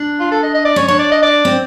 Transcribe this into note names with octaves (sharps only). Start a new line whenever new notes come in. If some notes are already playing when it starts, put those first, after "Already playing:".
Already playing: D4
F4
A4
D#5
D#5
D5
C#4 C#5
D4 C#5
D5
D#5
D5
C4